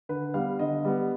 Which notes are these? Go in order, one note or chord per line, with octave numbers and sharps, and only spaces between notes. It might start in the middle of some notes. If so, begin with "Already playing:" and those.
D3 B4
G3 B3 F5
D3 D#5
G3 B3